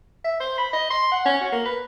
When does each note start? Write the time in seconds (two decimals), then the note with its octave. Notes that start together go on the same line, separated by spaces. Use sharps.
0.24 E5
0.40 C5
0.58 B5
0.73 D#5
0.90 C6
1.12 F#5
1.26 C#4
1.41 F#4
1.52 A#3
1.65 B4